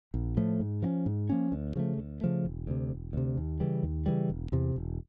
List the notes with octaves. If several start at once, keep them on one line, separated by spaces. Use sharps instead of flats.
A#1
A2 F3 A3
G#2
F3 A#3 C#4
G#2
F3 A#3 C#4
D2
C#3 F3 A3
D2
C#3 F3 A3
E1
D2 C3
E1
D2 C3
D#2
C#3 E3 G3
D#2
C#3 E3 G3
E1
E2 C3
E1